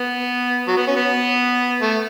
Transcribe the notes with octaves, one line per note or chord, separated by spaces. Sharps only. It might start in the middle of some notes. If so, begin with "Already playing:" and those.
Already playing: B3
F#3
B3
C#4
B3
A3